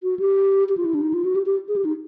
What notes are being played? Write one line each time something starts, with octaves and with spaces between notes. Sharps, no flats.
F#4
G4
G4
F4
E4
D4
D#4
F4
F#4
G4
G4
G#4
G4
D#4